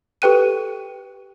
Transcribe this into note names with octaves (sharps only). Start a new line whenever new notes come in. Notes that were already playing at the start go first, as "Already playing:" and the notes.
G4 A4 B4 G5 F#6 D#7